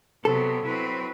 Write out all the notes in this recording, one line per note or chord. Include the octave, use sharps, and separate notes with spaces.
C3 F#3 B3 A4
F#3 C4 E4 B4